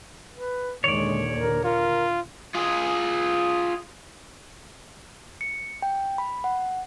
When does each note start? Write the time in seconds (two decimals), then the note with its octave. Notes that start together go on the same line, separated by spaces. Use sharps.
0.33 B4
0.84 D#2 A#2 D3 G#3 C#5 D5
1.35 A#4
1.65 F4 A#4
2.54 F4 G#4
5.41 C#7
5.82 G5
6.18 B5
6.44 F#5